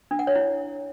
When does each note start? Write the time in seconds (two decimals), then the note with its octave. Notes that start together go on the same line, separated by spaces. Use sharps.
0.11 D4
0.19 F#5
0.27 C#5
0.35 E4